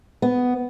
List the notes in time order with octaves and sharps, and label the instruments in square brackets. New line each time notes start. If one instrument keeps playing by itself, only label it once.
[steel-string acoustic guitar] B3